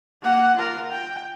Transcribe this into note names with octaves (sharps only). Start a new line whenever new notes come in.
A#3 F#5
F4 A#4
G5